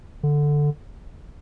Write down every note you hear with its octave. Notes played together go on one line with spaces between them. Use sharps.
D3